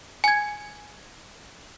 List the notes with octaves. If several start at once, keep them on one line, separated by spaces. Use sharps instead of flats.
G#5 G#6